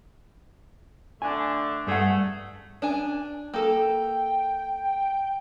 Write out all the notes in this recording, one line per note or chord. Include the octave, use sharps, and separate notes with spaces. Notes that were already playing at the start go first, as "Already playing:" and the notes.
D3 A3 D4 G#5
G2 A3 G#4 F#5
D4 G#5
A#3 A4 G5